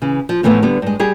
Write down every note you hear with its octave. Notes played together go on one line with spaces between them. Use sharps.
C#3 E3
F3
A2 E3 F3 A3 B3
D3 G3 B3
G2 G#3
G3 G4 G#4